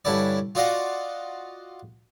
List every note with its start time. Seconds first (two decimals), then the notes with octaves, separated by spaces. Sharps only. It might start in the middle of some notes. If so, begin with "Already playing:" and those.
0.05 G2 D3 C#4 E4 D5
0.55 F4 F#4 D5 D#5 F5 F#5